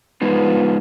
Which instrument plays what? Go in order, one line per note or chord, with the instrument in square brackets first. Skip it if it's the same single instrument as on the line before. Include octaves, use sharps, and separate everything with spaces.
[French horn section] G2 F3 B3 [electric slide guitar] G#3 D#4 F4